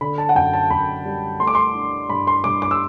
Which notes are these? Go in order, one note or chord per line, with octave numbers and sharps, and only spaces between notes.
D3 B5
A5
F#5
F#2 G5
A5
F#2 B5
G3
A3 C6
D6
C6
D4
G2 B5
C6
G2 D6
D6
E6